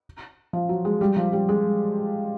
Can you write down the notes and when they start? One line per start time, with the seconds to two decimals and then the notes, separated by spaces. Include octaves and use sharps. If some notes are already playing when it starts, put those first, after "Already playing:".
0.53 F3
0.69 F#3
0.85 G#3
1.01 G3
1.17 F3
1.33 G3
1.49 G#3